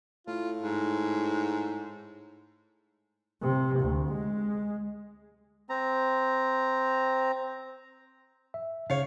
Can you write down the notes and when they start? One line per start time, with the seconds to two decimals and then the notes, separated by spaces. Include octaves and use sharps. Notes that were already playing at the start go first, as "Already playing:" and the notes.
0.27 A2 F4
0.62 G#2
3.42 C3
3.80 D2
4.12 G#3
5.69 C4 A#5
8.54 E5
8.90 C#3 C#5 F5